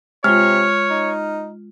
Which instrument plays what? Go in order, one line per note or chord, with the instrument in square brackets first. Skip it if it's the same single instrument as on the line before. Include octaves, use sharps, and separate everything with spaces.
[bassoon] C3 [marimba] G#3 F4 [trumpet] C#5 [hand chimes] F6
[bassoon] D#4